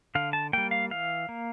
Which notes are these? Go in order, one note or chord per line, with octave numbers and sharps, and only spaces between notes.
D3 F5
A5
G3 A#3 G5
F5
E3 F5
A#3